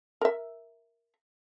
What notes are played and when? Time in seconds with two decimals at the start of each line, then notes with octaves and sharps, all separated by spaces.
0.21 A#4 E5